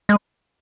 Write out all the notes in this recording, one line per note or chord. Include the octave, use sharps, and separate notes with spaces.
G#3